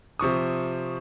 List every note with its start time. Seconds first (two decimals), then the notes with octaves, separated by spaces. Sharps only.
0.19 C3 F3 C#6 D#6